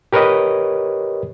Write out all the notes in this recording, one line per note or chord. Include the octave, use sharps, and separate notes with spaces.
G4 A#4 B4 C#5 D#5